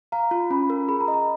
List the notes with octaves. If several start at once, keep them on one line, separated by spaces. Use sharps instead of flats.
F5 A#5
F4
C#4 B5
A#4
G#4 B5
A#5
D#5
A#5